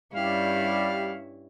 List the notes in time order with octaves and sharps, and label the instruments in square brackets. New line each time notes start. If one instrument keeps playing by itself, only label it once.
[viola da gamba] G2 C#4 E4 [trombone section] G3 [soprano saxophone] F5